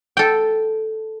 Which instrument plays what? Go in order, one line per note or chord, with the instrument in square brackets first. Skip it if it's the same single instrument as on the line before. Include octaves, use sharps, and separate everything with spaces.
[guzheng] A4 G5